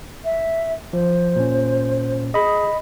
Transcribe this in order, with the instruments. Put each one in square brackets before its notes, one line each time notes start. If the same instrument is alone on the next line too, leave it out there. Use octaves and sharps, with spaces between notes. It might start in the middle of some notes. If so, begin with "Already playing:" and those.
[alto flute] E5
[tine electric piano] F3 [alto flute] C5
[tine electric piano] A#2 C#4
[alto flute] G#4 [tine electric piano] D#5 B5